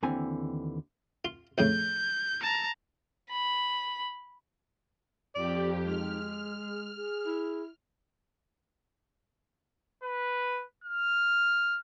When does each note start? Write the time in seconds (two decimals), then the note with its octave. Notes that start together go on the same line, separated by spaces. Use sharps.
0.03 D#2 D3 E3 C4 G#5
1.25 F4
1.58 F2 A2 C#3 G6
2.41 A5 A#5
3.30 B5
5.35 F2 G4 D5
5.85 G#3 D#4 F6
6.28 G#4
6.96 G#4
7.26 E4
10.04 B4
10.84 F6